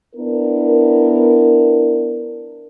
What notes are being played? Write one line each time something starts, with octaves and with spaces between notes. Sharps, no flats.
B3 D4 E4 A#4